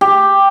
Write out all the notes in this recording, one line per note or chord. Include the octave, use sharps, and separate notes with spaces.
G4